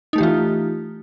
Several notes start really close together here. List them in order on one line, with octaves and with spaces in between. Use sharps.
D#4 A3 G4 E3 F4